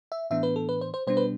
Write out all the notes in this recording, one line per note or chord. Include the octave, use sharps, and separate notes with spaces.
E5
A2 E3 B3 D4 E5
B4
A4
B4
C5
C5
B2 G3 B3 D4 C5
B4